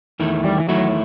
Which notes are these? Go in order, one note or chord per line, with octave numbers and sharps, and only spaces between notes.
E2 D#3 A3 E4
G3
E3
E2 D#3 F#3 A3 E4